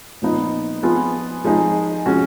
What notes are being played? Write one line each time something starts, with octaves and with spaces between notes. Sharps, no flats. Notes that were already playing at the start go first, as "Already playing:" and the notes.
A#2 F3 B3 D#4
F3 B3 F4 G#4
F3 G#3 D#4 G#4
F3 G#3 C#4 F#4